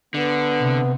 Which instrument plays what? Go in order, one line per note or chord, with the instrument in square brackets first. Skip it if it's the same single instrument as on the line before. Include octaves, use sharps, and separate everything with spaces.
[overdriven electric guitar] D3 [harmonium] B3
[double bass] C3